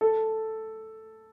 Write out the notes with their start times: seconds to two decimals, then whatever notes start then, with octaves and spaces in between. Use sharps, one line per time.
0.01 A4